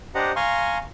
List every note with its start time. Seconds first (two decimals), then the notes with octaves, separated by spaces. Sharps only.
0.15 D4 G4 C5 D#5 F#5 A#5
0.36 F5 G#5 A#5 C6 C#6